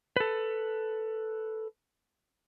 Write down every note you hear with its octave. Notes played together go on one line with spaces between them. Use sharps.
A4 B4